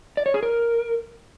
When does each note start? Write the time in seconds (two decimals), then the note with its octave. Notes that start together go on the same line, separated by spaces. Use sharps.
0.17 D5
0.26 C#5
0.34 G#4
0.43 A#4